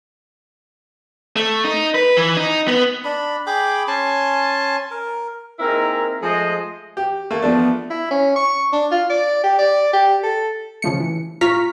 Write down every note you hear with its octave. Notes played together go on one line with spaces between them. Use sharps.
A3
D#4
B4
E3
D#4
B3
D4 B5
G#4 G5 B5 D6
C#4 G#5 A5 C6
A#4
A#3 C4 D#4 E4 G#4 A#4
F3 G#3 A3 G#4 C5 D#5
G4
A3 A#3
F3 A3 B3 D4
E4
C#4
C#6
D4
F4
D5
G4
D5
G4
A4
C#3 F3 A3 C#7
E3
A2 F4 A#5 C#6 F6 B6